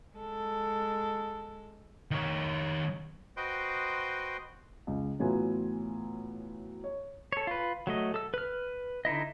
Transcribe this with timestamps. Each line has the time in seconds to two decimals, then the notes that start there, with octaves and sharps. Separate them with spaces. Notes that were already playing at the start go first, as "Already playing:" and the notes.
0.16 G#3 A4
2.11 D#3 C#5
3.37 F#4 B4 C5 D#5 G5 C6
4.87 C#2
5.20 A2 E3 F#3 B3 F4 G#5
6.84 C#5
7.32 A4 C#5
7.47 F4 B4
7.87 F#3 A3 D#5
8.14 A4 E6
8.34 B4 F6
9.05 D3 D#4 E4 D#5